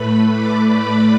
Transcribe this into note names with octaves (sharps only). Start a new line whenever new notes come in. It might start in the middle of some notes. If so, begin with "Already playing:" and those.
Already playing: A2 A3 B4 B5
D5 D6